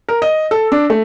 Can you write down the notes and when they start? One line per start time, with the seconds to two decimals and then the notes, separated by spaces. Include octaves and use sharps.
0.09 A#4
0.22 D#5
0.51 A4
0.72 D4
0.90 A3